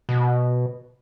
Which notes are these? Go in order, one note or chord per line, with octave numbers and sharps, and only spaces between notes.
B2